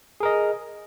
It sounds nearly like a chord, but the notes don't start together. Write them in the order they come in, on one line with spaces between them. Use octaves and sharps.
G#4 A#4 D#5